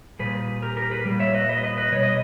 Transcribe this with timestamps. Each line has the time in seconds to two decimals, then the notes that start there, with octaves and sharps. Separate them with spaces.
0.19 A#2 G3 G#4 B4
0.62 G4 A#4
0.76 G4 A#4
0.91 G#4 B4
1.05 A#2 G3
1.19 C#5 E5
1.34 B4 D#5
1.49 B4 D#5
1.63 B4 D#5
1.77 B4 D#5
1.92 B2 G3 C#5
2.03 D#5